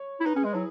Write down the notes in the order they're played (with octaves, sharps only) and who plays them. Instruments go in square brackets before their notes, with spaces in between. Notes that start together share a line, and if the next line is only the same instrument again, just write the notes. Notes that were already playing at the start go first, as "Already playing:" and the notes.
Already playing: [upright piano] C#5
[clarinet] E4
[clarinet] D#4 [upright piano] B4
[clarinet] C#4 [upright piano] G#4
[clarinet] G#3
[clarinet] F#3 [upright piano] E4